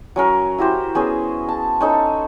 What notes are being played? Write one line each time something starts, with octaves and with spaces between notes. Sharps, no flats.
F#3 C#4 A#4
E4 F#4 G4 C5
B3 C#4 G#4 C5
A5
C#4 D#4 A4 C5